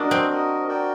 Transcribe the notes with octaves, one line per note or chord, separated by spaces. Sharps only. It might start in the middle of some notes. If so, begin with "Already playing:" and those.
Already playing: D4 F#4 A#4 D#5
C4
F#4 A#4 D#5
F#4 A#4 D5 G5